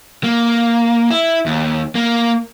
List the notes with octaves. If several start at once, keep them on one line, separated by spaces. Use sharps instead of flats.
A#3
E4
D#2
A#3